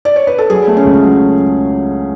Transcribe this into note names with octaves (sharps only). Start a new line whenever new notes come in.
D5
C#5
B4
A4
F#3 G#4
A3
C#4
C#2
F#3